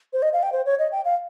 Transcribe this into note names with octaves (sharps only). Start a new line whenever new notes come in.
C5
D#5
F5
G5
C5
C#5
D#5
G5
F5